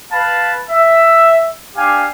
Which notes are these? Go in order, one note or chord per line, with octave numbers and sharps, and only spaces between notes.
B4 F5 A5 B5
E5
D4 G4 F5 G#5